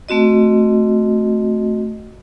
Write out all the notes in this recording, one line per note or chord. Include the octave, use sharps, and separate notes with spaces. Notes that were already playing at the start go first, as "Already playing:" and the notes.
A3 C4 F#4 D#5